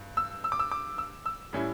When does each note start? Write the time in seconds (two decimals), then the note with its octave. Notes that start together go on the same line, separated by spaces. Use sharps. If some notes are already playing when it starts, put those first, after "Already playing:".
Already playing: G2
0.17 E6
0.44 E6
0.52 D6
0.59 E6
0.72 D6
0.98 E6
1.26 E6
1.53 A2 G3 C#4 E4